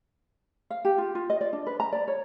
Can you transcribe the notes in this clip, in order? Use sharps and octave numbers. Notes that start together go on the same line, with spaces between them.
F5
G4
F4
F4
D#5
D5
D4
B4
A#5
D5
C#5